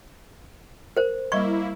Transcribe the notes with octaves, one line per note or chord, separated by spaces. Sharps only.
A#4 C5
G3 A#3 E4 D#5 C#6 G#6